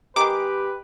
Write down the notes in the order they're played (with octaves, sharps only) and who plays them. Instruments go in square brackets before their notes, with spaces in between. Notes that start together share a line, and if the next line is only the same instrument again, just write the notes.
[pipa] D#3 G#3 [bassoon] G4 [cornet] B4 [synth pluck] D6